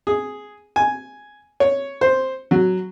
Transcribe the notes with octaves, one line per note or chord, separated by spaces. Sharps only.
G#4
G#5
C#5
C5
F#3